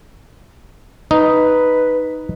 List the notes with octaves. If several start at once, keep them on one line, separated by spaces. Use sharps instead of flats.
D#4 B4